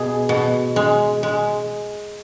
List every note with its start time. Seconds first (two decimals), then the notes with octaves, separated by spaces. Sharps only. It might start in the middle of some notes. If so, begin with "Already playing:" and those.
Already playing: B2 G#4
0.29 B2
0.76 G#3
1.23 G#3